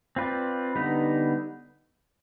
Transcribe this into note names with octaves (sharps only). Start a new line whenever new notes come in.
C4 F4 B4 D5
D3 G3 B3 D#4 B4